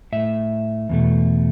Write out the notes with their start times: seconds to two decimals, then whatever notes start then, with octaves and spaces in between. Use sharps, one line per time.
0.12 A2 A3 E5
0.89 E2 B2 A3